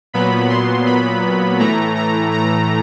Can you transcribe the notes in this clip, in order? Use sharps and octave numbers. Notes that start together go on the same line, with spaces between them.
A#2 F#3 B3 B5
C6
B5
A2 E3 A3 A#5
A#5
A#5